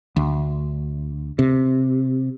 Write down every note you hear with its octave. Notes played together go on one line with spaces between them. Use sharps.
D2
C3